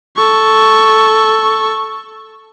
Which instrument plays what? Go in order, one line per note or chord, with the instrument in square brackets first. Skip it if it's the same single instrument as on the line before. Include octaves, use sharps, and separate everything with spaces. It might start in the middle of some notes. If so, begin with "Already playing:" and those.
[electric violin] A4 C#6